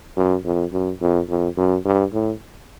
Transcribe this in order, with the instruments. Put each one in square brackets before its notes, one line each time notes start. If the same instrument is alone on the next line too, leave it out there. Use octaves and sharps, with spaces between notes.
[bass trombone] F#2
F2
F#2
F2
F2
F#2
G2
A2